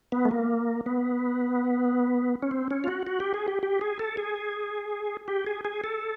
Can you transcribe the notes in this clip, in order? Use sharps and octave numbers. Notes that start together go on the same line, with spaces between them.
B3
A3
A#3
B3
C#4
C4
C#4
F4
F#4
F#4
G4
G#4
G4
G4
G#4
A4
G#4
G4
G#4
G#4
A4